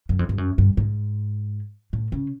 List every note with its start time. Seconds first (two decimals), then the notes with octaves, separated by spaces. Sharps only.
0.09 F#2
0.19 F2
0.29 G2
0.38 F#2
0.58 G2
0.77 G#2
1.93 A2
2.12 C#3